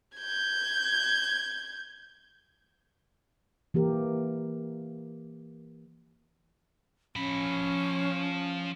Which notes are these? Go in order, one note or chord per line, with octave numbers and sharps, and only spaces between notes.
G6 G#6
E3 A#3 G4 A#4
F3 C#4 B5